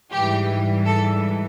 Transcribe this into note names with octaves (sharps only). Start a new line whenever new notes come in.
G#2 E3 G3 G4
A4